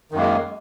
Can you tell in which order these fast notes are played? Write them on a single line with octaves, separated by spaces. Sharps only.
D#3 F#2 A#3 G#3